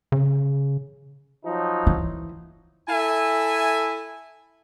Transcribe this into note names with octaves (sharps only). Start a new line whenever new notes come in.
C#3
F3 F#3 D#4
E3
E4 A4 E5 G#5